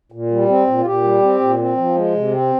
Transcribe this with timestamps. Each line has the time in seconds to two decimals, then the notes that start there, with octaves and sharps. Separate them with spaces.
0.12 A#2
0.31 G3
0.49 C4
0.67 A#2
0.78 F4
0.86 A#2 G4
1.03 G3
1.22 C4
1.40 A#2
1.59 C4
1.77 F3
1.96 G#3
2.14 C3
2.32 C4